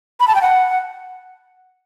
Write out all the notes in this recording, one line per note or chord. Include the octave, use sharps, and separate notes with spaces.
B5
A5
G5
F#5